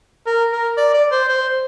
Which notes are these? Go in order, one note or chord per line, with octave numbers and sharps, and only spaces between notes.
A#4
A#4
D5
D5
C5
C5